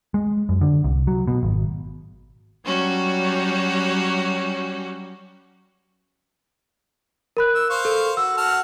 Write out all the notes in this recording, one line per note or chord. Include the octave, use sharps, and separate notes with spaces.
G#3
F#2
D3
C2
F#3
B2
G#1
F#3 G3 C#4 F#4
A#4 B5 F#6
E6
C5 F5 C#6
A4
F#4 E6
F#4 A5 F6